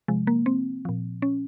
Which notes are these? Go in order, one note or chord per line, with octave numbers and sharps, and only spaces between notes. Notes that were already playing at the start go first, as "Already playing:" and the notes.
C3 F3 G#3
A#3
C4
A#2 F3
C#4